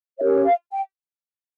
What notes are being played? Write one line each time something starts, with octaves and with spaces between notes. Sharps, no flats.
C#4 G4 A#4 C#5 E5
F5
G5